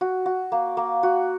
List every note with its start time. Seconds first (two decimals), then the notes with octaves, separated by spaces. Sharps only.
0.01 F#4
0.26 F#4
0.52 A#3
0.77 A#3
1.03 F#4